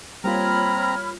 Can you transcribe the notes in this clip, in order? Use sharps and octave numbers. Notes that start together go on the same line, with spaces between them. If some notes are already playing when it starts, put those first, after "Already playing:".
G3 A#3 C4 F4 C#5 A#5 B5 F6